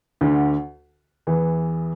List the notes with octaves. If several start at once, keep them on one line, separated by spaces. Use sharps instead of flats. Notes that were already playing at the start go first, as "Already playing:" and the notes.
D2 D3
E2 E3